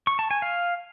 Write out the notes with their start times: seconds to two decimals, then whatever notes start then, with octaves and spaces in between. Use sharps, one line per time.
0.07 C#6
0.19 A5
0.31 G#5
0.42 F5